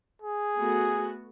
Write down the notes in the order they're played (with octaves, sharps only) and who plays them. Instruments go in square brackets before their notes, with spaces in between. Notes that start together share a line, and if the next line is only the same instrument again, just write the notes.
[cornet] G#4
[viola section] A3 B3 F#4